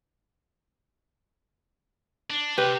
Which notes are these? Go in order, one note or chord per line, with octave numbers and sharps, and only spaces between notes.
D4
C3 G4 B4